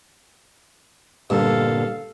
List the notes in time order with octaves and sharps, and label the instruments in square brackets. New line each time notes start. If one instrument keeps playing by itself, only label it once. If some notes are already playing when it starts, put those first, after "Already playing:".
[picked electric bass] G1 A#2 D3 [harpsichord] G2 [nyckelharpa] A4 F5